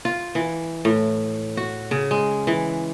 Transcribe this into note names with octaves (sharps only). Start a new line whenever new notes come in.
F4
E3
A2
F#4
C#3
G#3
E3